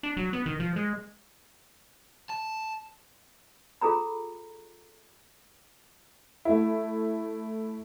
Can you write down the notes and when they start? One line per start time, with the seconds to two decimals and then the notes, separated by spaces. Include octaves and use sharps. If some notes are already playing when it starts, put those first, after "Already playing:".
0.03 D4
0.17 F#3
0.33 B3
0.46 D#3
0.60 F3
0.76 G#3
2.29 A5
3.81 F4 G#4 A4 A#5 B5
6.45 A3 E4